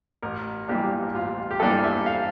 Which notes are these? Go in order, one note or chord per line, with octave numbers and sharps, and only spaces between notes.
A1 A#4
G2 E3 A#3 D4 G4
A1 F4
G4
G2 E3 A#3 D4 A4
E5
F5